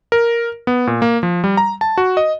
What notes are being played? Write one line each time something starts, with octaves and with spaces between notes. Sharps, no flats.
A#4
B3
A#2
A#3
F3
G3
A#5
A5
F#4
D#5